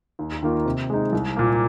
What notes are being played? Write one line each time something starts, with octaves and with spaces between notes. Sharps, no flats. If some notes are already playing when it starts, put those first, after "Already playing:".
D#2
D#3 A#3 F4
C3
G#3 D#4
C2
A#2 A#3